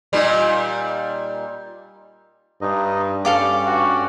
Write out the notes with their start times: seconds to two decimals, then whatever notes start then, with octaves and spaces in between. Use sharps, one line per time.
0.13 A#2 G3 D#4
2.61 G2 D#4 D#5
3.25 G2 C#4 G4 A4 D5 F5 D6
3.65 F#4